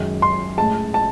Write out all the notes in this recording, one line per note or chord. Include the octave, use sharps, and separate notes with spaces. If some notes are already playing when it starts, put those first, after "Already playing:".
Already playing: F#2 D#3 G#3
C6
A2 G#3 A5
A5